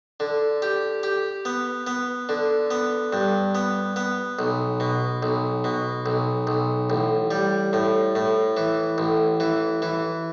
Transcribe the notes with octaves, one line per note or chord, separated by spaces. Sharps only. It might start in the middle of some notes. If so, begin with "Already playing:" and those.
D3
G4
G4
B3
B3
D3
B3
G2
B3
B3
B1
B2
B1
B2
B1
B1
A1
G3
A2
A2
E3
A1
E3
E3